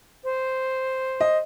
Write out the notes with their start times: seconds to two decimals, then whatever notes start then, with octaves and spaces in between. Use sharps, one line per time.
0.24 C5
1.21 D#5